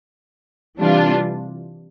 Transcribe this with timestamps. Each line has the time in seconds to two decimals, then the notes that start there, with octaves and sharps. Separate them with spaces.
0.79 C3 E3 G3 D4 F4